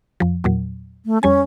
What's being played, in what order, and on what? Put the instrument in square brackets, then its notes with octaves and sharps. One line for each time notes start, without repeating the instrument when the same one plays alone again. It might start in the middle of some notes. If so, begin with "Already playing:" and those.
[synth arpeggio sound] F2 F3
E2 A#2 F#3
[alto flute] A3
[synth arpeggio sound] F2 G3 G#5 [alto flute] C#4